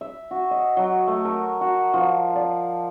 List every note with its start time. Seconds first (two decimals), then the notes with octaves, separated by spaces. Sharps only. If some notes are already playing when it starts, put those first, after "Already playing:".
0.01 E5
0.31 F#4
0.51 D#5
0.77 F#3
1.08 A3
1.25 A#4
1.61 F#4
1.94 F3
2.35 D5